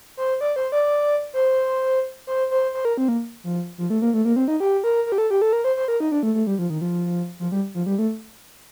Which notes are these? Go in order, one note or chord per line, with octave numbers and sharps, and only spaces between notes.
C5
D5
C5
D5
C5
C5
C5
C5
A#4
C4
A#3
F3
F3
A3
A#3
A3
A#3
C4
D#4
G4
A#4
A#4
G4
A4
G4
A4
A#4
C5
C5
A#4
D#4
D4
A3
A3
G3
F3
D#3
F3
F3
G3
F3
G3
A3